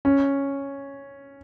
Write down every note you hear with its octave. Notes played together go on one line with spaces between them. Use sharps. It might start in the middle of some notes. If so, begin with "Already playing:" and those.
C#4